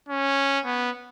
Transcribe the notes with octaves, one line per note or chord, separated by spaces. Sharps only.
C#4
B3